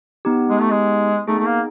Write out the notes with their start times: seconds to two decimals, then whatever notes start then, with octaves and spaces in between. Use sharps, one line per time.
0.25 B3 D#4 G4
0.50 G#3
0.61 A3
0.71 G#3
1.28 A3 B3 D#4 G#4
1.39 A3
1.45 A#3